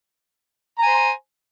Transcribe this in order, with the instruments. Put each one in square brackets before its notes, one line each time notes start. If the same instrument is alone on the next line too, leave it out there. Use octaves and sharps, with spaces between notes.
[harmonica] A#5
G#5
C5